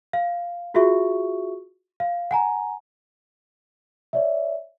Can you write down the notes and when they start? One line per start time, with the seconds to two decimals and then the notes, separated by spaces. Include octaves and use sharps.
0.13 F5
0.74 F4 F#4 G#4 E5 C#6
2.00 F5
2.31 F#5 G#5 A#5
4.13 C#5 D5 E5